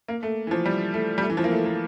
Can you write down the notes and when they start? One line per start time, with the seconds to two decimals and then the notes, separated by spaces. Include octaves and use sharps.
0.08 A#3
0.23 A3
0.47 E3
0.51 F3
0.66 G3
0.94 A3
1.18 G3
1.23 A3
1.30 E3
1.37 F3
1.44 A#3
1.51 A3
1.65 A#3